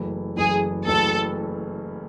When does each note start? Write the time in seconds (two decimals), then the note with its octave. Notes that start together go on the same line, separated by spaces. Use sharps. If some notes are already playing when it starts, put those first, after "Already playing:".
Already playing: F#1 F#2 E3 A3
0.37 F#1 F#2 E3 A3 G#4
0.86 F#1 F#2 E3 A3 A4